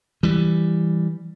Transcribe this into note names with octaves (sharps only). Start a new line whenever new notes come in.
E3 G3